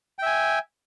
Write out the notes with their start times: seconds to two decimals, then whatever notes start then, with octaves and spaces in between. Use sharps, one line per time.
0.19 G5
0.22 E5
0.26 G#5